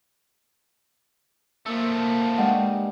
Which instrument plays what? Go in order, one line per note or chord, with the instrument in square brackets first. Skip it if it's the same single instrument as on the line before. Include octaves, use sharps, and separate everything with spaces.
[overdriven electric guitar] F3 A3 [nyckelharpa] A#3 [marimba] E6
[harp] G2 G#3 [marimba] F#5